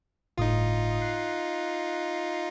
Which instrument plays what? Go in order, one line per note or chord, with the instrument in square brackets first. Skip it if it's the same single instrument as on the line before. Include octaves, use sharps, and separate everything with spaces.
[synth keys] G1 A2 D#6 [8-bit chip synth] D#4 F4
[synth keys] F#6 C7